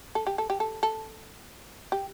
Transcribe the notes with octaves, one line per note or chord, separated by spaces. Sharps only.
A4
G4
A4
G4
A4
A4
G4